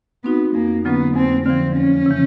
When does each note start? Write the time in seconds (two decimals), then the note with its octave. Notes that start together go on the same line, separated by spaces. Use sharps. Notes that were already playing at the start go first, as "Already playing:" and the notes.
0.24 B3 C4 D#4 F#4
0.55 F2 A#3
0.85 D3 F#3 A#3 B3 C#4
1.15 F2 C4
1.46 D3 F3 C4
1.76 E2 C#4
2.06 C#3 E3